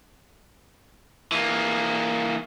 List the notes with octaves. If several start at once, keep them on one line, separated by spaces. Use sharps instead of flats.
E3 A#3